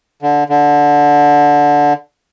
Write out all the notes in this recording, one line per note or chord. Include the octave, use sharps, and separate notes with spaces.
D3
D3